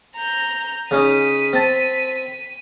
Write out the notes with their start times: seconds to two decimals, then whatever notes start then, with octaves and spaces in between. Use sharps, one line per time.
0.16 A#5 G6
0.91 C#3 C#4 D#4 B6 D#7
1.53 C4 A5